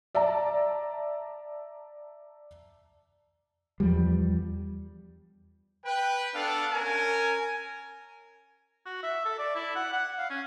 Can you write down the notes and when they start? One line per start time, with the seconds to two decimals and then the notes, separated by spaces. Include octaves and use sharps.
0.15 D5 E5 A5 A#5
3.80 E2 F3 G3
5.85 B4 G5
6.34 B3 D4 A4 F5
6.72 C#4 A#4 G#5
8.86 F#4
9.03 E5
9.25 A4
9.38 D5
9.55 E4
9.76 F#5
9.93 F#5
10.18 F5
10.30 C#4